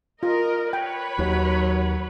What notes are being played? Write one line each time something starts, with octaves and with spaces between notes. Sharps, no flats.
F4 A#4 D#5
B4 C#5 G5 B5
D#2 F#3